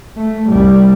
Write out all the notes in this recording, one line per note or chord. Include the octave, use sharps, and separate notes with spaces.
A3
C2 G3